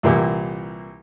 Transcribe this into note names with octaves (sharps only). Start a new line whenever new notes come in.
C2 A#2 E3 A#3 G4 G5